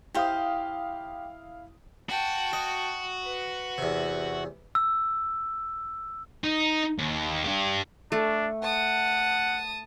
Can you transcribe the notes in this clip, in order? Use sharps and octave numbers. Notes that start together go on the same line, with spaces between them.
E4 G4 C5 F5 D#6
F#4 G5 A5
F#4 D#5
B4
E2 C3
E6
D#4
D#2
D4 G4
A3 D4
F#5 A5 D#6